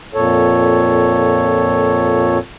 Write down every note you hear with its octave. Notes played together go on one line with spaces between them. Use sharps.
F2 A#2 A4 C#5